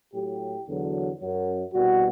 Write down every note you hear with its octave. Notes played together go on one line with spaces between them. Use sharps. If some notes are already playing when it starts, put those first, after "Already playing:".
A2 F#3 G4
E2 D3 F#3
F#2 F#3
C2 B2 G3 F#4